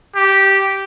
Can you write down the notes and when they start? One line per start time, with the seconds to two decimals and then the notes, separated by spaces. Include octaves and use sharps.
0.15 G4